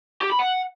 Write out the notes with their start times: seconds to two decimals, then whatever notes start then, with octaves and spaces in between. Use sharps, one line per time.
0.21 G4
0.30 B5
0.39 F#5